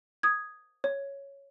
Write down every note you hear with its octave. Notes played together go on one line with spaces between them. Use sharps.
D#6 G#6
C#5